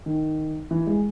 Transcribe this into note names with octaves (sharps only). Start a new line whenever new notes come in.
D#3
E3
G#3